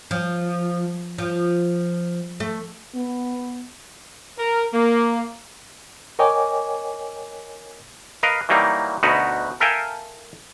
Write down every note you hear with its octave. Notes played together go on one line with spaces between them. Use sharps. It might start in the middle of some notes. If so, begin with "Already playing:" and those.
F3
F3
A3
B3
A#4
A#3
A#4 C#5 D#5 G5 G#5 D6
A#4 B4 D#5 F5
E3 F#3 G3 A#3 D#4
D2 B2 D#4 F#4 B4
A4 A#4 E5 F5 G5 G#5